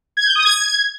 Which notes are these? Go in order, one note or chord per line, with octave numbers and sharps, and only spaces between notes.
G#6
G6
D#6
G#6